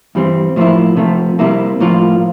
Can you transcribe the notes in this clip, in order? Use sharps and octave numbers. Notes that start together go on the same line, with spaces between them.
G2 E3 G3 C4
A2 F3 A#3 E4
C3 F3 A3
C3 G3 A#3 E4
A2 F3 A#3 F4